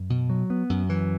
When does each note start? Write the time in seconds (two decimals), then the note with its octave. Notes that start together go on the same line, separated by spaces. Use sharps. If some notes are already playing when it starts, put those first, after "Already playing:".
Already playing: F#2
0.10 B2
0.30 F#3
0.50 B3
0.70 F#2
0.89 E3